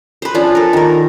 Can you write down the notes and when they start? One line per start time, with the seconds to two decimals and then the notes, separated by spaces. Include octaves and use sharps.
0.22 B4 C5
0.35 F3 C#4 D4 F4
0.55 A4 A#4
0.73 D#3 A#4